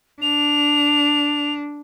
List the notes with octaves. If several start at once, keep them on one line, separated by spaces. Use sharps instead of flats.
D4 F7